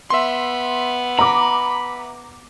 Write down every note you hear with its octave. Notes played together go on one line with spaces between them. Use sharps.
B3 E5 C6
A#5 B5 D6